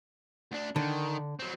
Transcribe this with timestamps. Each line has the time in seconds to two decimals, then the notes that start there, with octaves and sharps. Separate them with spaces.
0.52 D2 D4
0.76 D3 D#3
1.40 F#3 C4